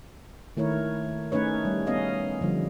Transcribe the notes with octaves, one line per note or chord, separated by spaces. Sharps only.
D#3 A3 E4 A#4 C#5
A3 C#4 D#4 B4 C#5
G3
B3 C#4 D#5 F5
D3 F3 G3